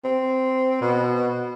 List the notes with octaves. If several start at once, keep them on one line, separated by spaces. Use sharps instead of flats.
C4
B2